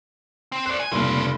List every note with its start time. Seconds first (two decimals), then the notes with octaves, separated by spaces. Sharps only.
0.52 C4
0.66 C5 D5 F#6
0.79 G#5
0.92 F1 G2 A#2 C#3 C4